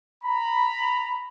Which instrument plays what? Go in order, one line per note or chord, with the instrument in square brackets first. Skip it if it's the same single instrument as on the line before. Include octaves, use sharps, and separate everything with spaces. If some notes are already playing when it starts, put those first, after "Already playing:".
[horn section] A#5 B5